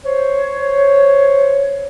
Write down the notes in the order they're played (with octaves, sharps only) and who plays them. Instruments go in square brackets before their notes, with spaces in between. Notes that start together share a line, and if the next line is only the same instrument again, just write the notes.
[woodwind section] C5 C#5